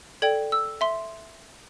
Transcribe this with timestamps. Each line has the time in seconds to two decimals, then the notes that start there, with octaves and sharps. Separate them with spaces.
0.22 A4 D5 G5 G#6
0.52 E6
0.81 E5 C6